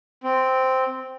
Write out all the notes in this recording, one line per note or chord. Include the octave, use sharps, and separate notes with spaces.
C4